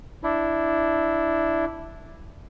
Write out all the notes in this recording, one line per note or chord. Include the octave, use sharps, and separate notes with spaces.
D4 E4